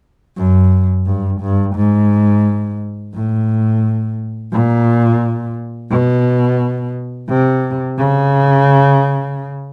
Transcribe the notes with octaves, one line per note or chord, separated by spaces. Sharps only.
F#2
G2
G2
G#2
A2
A#2
B2
C3
C#3